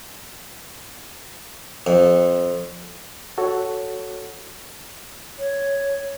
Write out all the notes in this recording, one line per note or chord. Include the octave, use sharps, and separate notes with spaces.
F2
F#4 A4 C#5 F#5
C#5